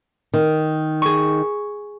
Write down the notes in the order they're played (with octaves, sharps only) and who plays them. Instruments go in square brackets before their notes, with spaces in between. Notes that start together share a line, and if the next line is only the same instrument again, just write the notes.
[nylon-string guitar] D#3
[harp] G#4 C#6